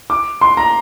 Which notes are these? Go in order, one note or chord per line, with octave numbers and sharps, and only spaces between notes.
D6
C6
A#5